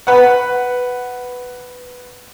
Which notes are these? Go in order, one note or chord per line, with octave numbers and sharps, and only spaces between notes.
B4 F#5